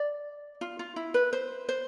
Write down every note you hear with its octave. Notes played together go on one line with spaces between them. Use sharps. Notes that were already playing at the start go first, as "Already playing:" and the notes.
Already playing: D5
F4
F4
E4
B4
C5
C5